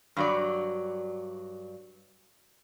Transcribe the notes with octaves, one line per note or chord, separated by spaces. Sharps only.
G2 F#3 D5